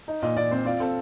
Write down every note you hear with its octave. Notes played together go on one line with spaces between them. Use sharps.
D#4
A#2 D#5
A#2 D5
C4 C5
F4 D5
C4 A4